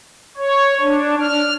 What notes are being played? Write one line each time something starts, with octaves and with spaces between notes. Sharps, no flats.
C#5
D4
F6